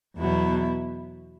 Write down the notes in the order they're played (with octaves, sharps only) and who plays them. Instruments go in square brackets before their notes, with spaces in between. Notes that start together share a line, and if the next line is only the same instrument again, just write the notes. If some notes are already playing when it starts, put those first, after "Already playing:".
[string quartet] E2 B2 F#3 E4